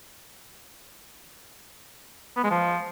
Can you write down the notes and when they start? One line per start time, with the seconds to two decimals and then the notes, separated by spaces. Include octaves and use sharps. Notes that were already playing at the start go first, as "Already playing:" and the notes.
2.37 B3
2.44 G#3
2.51 F3